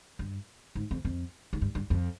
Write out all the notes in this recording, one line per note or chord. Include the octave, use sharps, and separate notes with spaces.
G2
G#2
F2
F2
G#2
G2
G2
F2